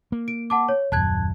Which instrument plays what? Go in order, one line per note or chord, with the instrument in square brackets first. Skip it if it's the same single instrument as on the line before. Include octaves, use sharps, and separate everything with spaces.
[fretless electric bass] A#3
[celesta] D7
F#5 A5 D6
C#5
[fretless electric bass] D#1 F#2 [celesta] A5 F#6 G#6